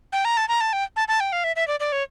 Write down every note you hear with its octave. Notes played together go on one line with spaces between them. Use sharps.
G5
A#5
A5
A#5
A5
G5
A5
A5
G5
F5
E5
E5
D5
D5
C#5